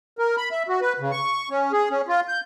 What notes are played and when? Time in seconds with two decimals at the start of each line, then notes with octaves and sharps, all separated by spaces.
0.19 A#4
0.37 B5
0.51 E5
0.68 F#4
0.81 B4
1.00 C#3
1.11 C#6
1.50 C#4
1.72 G#4
1.90 C#4
2.08 F4
2.28 G6